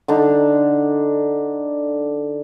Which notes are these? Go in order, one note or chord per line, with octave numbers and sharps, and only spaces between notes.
D3 D4 D#4